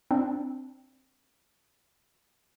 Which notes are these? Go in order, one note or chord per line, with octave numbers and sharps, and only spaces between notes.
C4 D4